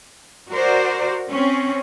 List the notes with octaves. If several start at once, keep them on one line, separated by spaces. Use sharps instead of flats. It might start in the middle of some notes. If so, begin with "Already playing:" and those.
F#4 A#4 C5 D5
C4 C#4